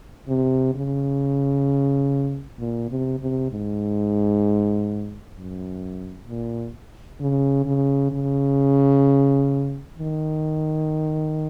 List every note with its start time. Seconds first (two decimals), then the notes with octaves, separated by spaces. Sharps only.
0.28 C3
0.74 C#3
2.59 A#2
2.89 C3
3.20 C3
3.51 G#2
5.35 F#2
6.27 A#2
7.20 C#3
7.65 C#3
8.12 C#3
9.97 D#3